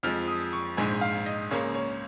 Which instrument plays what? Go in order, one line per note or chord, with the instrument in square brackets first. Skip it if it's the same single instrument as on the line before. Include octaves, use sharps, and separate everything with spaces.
[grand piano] F2 F3 G#3 F6
D#6
C#6
A#1 G#2 G#3 G#5
F5
D#5
C#2 C#3 A#3 C#5
C#5